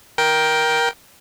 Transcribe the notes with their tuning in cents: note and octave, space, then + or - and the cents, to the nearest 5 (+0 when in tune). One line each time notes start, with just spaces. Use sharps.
A#4 +15 G5 +0